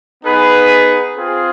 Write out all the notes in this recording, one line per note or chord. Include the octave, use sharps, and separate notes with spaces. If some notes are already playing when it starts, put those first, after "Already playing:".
B3 D#4 G#4 B4
C4 F4 G#4